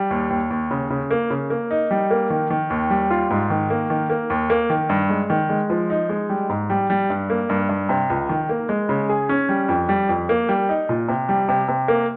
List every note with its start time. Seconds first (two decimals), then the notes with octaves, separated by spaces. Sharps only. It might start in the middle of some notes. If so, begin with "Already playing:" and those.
Already playing: G3
0.11 D#2
0.30 D#2
0.50 D#2
0.71 C#3
0.90 C#3
1.11 A#3
1.30 C#3
1.50 A#3
1.71 D#4
1.91 G3
2.11 A#3
2.30 D#3
2.50 D#3
2.70 D#2
2.90 G3
3.10 F4
3.30 G#2
3.50 D#3
3.70 A#3
3.90 D#3
4.10 A#3
4.30 D#2
4.50 A#3
4.70 D#3
4.89 G2
5.10 G#3
5.30 D#3
5.49 G#3
5.70 F3
5.90 D#4
6.09 G#3
6.29 G3
6.49 G#2
6.70 G3
6.90 G3
7.10 G2
7.30 A#3
7.49 G2
7.69 G2
7.89 C3
8.10 C#2
8.29 D#3
8.49 A#3
8.69 G#3
8.89 C#3
9.09 G#4
9.29 C#4
9.49 G3
9.69 F2
9.89 G3
10.09 F2
10.29 A#3
10.49 G3
10.69 D#4
10.89 A#2
11.09 C3
11.29 G3
11.49 C3
11.68 C3
11.88 A#3